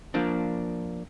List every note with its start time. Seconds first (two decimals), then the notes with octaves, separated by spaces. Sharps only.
0.14 F3 A#3 D4